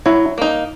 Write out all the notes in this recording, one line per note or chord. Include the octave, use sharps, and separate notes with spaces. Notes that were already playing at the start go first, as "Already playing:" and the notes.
F#3 E4
A#3 D#4